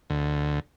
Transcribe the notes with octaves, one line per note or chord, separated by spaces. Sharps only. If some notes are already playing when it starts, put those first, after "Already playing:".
D2